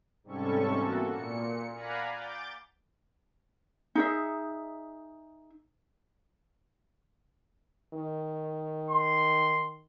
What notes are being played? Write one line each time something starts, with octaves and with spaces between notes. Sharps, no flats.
G#2 C3 G3 C#4 A4 C#6
E3 A#3 B3 F#4 A4
A#2 C#7
D5 F5 F#5 G#5 A#5 B5
D6 G6 A6
D#4 G#4 E5
D#3
C6